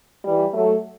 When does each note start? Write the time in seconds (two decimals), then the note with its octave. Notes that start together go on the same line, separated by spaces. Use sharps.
0.25 E3 G3
0.54 F#3 A3